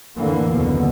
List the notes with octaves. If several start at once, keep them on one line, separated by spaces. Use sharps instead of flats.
F2 A2 D3 E3 A#3
F#1 D#2 B2 D3